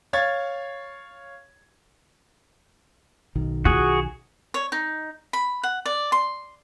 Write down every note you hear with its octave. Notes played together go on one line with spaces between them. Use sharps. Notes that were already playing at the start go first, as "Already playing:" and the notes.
C#5 F5 C#6 G#6 A6
B1 D#3
F4 F#4 G#4
C#5
D#4
B5
F#5
D5
C6